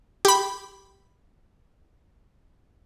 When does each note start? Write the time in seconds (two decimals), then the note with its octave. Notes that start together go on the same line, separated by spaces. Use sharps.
0.25 G4 B5